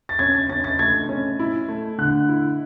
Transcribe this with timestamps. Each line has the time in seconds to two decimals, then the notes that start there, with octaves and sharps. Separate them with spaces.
0.09 A6
0.19 C#4 G#6
0.34 A6
0.49 C#4 A6
0.64 A6
0.79 A3 G#6
1.09 C#4
1.39 E4
1.69 A3
1.98 D3 F#6
2.29 E4